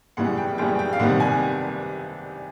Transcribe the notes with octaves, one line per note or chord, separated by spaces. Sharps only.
F#2 C#3 E3 G3 B3 F#5
G5
F#2 C#3 E3 G3 B3 G5
G5
F5
C2 C3 D#3 G3 B3 F#5
G#5